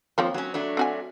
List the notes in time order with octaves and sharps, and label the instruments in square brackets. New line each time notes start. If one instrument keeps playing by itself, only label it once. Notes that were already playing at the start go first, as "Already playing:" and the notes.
[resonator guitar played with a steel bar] F3 [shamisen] A#3 C4 C#5
[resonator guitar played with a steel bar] F#3 C#4
F#3 A3 D4
[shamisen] C4 F#4 G#5